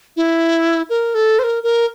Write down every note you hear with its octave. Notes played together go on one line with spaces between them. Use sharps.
E4
A#4
A4
C5
A#4
A#4